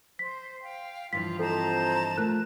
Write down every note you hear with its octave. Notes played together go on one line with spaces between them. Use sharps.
C5 B6
F5 G5
G2 E3 F3 F4 B6
C4 F4 A4 C5 D#5 A5 A#5
A3 F4 A#4 F#6